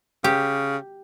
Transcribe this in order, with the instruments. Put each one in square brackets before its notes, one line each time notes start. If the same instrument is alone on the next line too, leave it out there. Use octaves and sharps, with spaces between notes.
[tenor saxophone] C#3 [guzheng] G4